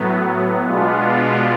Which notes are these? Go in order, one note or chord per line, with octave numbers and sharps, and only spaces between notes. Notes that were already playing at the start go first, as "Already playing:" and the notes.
Already playing: A2 F#3 B3
B2 G#3 B3 D4 F4